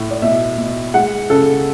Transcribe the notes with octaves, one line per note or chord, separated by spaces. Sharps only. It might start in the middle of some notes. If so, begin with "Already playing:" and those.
Already playing: A2
D5
B2 E5
B2
G#3 F#5
C#3 A4